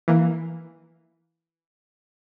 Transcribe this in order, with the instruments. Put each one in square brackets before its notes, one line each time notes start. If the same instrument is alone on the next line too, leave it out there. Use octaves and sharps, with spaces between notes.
[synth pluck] E3 A#3